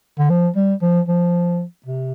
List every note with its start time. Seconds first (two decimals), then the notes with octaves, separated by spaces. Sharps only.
0.19 D3
0.30 F3
0.56 G3
0.82 F3
1.08 F3
1.86 C3